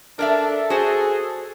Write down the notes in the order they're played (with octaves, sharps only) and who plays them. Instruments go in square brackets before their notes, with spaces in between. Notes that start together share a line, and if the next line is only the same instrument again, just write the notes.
[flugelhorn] D4 [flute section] A4 [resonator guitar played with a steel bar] A#4 D5 E5
[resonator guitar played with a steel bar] F#4 C5 [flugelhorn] G#4